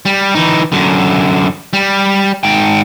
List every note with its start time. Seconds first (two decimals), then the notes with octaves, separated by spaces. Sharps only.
0.05 G3
0.35 E3 D#4
0.72 F#2 D3
1.73 G3
2.43 G#2 G5